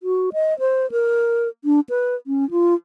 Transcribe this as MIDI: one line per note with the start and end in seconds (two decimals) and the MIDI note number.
0.03 0.30 66
0.33 0.58 75
0.60 0.90 72
0.92 1.48 70
1.65 1.80 62
1.90 2.15 71
2.27 2.49 61
2.51 2.74 65